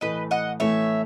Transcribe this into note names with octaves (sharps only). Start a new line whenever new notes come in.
A2 E3 A3 B4 D#5
D#5 F#5
A2 E3 A3 C#5 E5